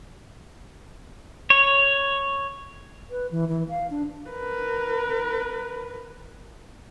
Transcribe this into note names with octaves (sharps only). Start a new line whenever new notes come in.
C#5
B4
E3
E3
F5
D4
A#4 B4